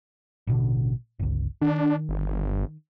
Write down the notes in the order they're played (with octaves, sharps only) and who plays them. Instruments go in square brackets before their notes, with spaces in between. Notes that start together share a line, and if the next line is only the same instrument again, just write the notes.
[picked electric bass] A1 B2 D3
G1 C#2
[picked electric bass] D#3 [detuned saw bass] D4
[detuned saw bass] G1